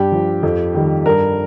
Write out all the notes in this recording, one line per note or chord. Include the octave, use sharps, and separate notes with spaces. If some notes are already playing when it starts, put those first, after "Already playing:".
Already playing: G2 G4
F3
F2
D#3 G3
G2 A#4